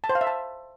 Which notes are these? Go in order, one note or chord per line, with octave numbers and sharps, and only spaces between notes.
A5
C5
F5
E5
A5